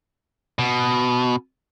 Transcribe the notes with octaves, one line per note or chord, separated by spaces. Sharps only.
B2